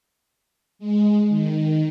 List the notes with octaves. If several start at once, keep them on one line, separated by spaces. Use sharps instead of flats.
G#3
D#3